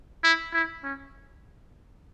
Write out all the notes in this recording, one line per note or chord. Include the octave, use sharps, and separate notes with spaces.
E4
E4
C#4